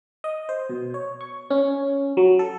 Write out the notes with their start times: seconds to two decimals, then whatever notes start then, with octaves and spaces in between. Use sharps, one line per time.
0.24 D#5
0.49 C5
0.70 B2
0.94 C#5
1.21 C#6
1.50 C#4
2.17 F#3
2.39 A4